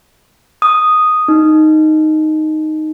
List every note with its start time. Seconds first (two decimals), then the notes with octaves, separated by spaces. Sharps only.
0.62 D#6
1.28 D#4